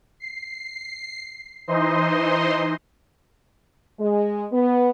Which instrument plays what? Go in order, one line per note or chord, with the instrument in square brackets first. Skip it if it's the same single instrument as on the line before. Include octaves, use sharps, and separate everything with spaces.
[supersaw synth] C7
E3 D#4 C5 D#5 C6
[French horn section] G#3
B3